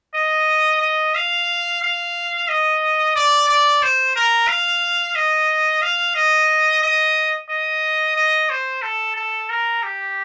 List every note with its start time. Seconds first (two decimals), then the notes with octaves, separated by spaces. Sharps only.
0.14 D#5
0.81 D#5
1.15 F5
1.82 F5
2.48 D#5
3.16 D5
3.49 D5
3.82 C5
4.16 A#4
4.48 F5
5.15 D#5
5.82 F5
6.15 D#5
6.82 D#5
7.49 D#5
8.16 D#5
8.50 C5
8.82 A4
9.16 A4
9.50 A#4
9.83 G4